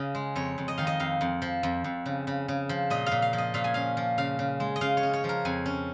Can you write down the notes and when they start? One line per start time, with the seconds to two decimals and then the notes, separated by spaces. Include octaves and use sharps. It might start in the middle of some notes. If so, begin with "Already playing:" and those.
Already playing: C#3 D#5 F5
0.15 G#3
0.36 F2 C#5
0.58 F2
0.68 D#5
0.78 D#3 F5
0.87 D#5
1.00 F2 F5
1.21 F2
1.42 F3
1.63 F2
1.84 F2
2.06 C#3
2.27 C#3
2.48 C#3
2.69 F3
2.90 A#2 D#5
3.06 F5
3.11 A#2
3.22 F5
3.33 F3
3.38 D#5
3.54 A#2 F5
3.64 G#5
3.74 C#4 F5
3.97 F3
4.18 C#3 F5
4.39 C#3
4.60 G#3
4.76 D#5
4.81 C#3 F5
4.97 C#5
5.03 C#4
5.13 C#5
5.24 F3
5.29 A#4
5.45 F2 G#5
5.66 C#4